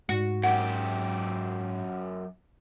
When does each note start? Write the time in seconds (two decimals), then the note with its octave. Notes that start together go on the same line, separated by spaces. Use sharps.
0.09 G#2 F#4
0.43 F#2 G4 F#5